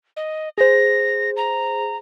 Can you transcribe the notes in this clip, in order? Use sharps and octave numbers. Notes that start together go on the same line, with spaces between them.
D#5
G#4 C5 A#6
A#5